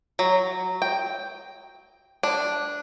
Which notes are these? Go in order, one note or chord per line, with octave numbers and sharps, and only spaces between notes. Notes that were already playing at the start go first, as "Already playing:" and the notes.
F#3
G5
D4